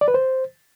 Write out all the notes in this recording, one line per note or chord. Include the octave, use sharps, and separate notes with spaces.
D5
B4
C5